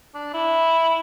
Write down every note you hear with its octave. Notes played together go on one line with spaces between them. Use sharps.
D4
E4